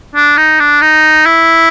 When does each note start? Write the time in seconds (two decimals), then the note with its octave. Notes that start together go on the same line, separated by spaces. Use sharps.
0.15 D4
0.37 D#4
0.60 D4
0.81 D#4
1.26 E4